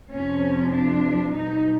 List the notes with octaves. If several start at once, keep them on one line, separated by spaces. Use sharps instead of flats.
F2 C3 F3 C#4
D4
B2 G3 D#4